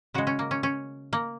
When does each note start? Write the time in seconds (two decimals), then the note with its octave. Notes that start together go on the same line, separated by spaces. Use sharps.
0.14 C#3 G#3 F#4
0.27 C#4
0.39 A#3
0.51 C#4
0.63 C#4
1.13 A#3